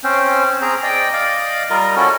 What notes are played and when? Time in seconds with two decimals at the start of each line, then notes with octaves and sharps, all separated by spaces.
0.04 C4 C#4 C5
0.62 C4 G#4 A#5
0.83 D5 D#5 G5
1.13 D5 D#5 F5
1.70 G3 F4 A#4 D#5
1.96 C#4 E4 F#4 A4